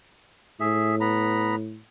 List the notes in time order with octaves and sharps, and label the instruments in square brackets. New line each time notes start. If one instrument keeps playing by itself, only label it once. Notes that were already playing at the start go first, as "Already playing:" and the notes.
[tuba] A2 [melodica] G#4 E5
[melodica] B3 A#5 B5